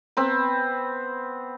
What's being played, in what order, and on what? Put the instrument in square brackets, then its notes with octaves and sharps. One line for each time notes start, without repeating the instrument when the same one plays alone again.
[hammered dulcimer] B3 C4 B5